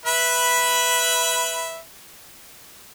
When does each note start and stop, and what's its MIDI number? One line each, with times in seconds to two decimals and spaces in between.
0.06 1.78 71
0.06 1.78 76
0.06 1.78 83